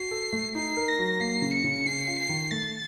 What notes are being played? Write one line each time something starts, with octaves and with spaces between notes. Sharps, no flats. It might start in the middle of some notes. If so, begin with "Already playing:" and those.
Already playing: F#4 C7
A4
A3
D#4 C7
A#4
A#6
F#3
A#3 C7
C#3
C#7
C#3
C#4 C7
F4
C7
D#3
A3 A6